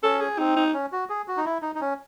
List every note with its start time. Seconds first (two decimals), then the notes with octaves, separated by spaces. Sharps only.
0.03 C#4 A4
0.21 G#4
0.39 C4 D#4
0.56 D#4
0.74 C#4
0.92 F#4
1.09 G#4
1.28 F#4
1.37 D#4
1.46 E4
1.62 D#4
1.75 D#4
1.81 C#4